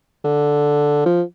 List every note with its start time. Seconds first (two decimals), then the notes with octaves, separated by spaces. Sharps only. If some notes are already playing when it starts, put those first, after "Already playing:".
0.24 D3
1.05 F3